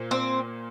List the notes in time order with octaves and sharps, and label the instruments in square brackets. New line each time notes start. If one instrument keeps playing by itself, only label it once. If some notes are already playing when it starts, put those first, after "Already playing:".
Already playing: [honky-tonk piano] A#2 A#3 F4 C5
[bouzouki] C4